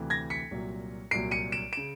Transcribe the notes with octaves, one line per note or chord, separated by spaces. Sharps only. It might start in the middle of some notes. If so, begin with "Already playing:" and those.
Already playing: D2 C3 E3
G#6 A#6
B6 C#7
C2 A#2 F#3
C2 A#2 F#3 C7 D7
C#7 D#7
D7 E7
C#3 D7 E7